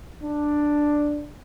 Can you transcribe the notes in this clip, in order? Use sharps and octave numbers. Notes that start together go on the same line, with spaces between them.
D4